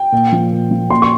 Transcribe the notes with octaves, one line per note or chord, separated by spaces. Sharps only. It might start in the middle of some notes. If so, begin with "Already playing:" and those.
Already playing: G5
A#2
F3
A#2
F3
A#2 C6
C#6